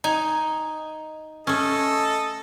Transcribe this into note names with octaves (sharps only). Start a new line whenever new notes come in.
D#4 G#5
A3 C#4 A4 D#5